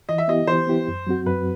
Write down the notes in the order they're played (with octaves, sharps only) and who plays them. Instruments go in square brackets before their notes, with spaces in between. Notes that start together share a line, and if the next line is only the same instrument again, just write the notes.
[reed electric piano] E3 [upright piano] D#5
[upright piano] E5
[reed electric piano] B3 E4 G4 [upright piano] D#5
[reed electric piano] E3 [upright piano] C5
[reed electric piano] B3 E4 G4
F#2
F#3 C4 F#4
[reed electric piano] F#2 [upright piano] B4